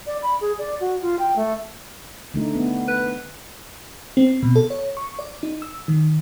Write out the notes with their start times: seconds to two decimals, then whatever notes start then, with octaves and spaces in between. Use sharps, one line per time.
0.07 D5
0.22 B5
0.41 G#4
0.58 D5
0.80 F#4
1.02 F4
1.19 G5
1.36 A3
2.34 D3 A3 D#4
2.55 B3
2.88 B4
4.17 C4
4.43 B2
4.56 A4
4.70 C#5
4.97 C#6
5.19 D5
5.43 D#4
5.62 E6
5.88 D#3